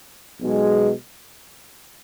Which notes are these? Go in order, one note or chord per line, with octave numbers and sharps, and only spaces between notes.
B1 B2 G#3